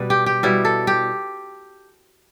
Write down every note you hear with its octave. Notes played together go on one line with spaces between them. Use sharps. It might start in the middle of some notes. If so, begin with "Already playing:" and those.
Already playing: B2 G3 B4
G4
G4
B2 G3 E4
A4
G4